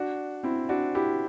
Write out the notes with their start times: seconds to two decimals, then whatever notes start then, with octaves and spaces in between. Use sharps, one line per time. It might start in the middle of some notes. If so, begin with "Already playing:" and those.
Already playing: D4 F#4
0.43 C4 E4
0.69 D4 F#4
0.95 E4 G4